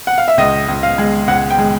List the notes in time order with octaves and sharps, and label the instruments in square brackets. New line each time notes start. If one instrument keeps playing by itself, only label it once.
[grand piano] F#5
F5
E5
C#2 D#5
C#2
F5
G#3
C#2 F#5
G5
G#3